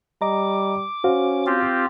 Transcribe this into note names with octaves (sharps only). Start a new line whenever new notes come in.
G3 D#5 A#5 D6
C#4 F#4 C5 F5
C4 F4 G4